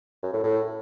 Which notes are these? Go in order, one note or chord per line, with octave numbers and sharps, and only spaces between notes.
F#2
A2
A2